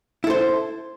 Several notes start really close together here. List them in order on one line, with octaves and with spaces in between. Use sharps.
E4 A4 C5